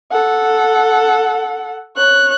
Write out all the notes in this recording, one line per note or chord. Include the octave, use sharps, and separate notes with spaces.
A4 F#5
C#5 F#6